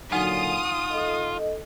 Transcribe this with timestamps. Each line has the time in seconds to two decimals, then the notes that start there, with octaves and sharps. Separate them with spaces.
0.12 A#2 D3 F#3 D#4 F4 F#5 G#5 D#6
0.92 A4 D#5